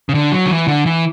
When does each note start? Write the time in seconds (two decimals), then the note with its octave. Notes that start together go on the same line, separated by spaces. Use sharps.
0.09 C#3
0.14 D3
0.32 F#3
0.46 D3
0.51 E3
0.68 D3
0.86 E3